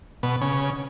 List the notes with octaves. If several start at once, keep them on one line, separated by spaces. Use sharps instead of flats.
B2
C#3